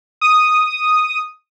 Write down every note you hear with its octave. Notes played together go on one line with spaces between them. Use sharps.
D#6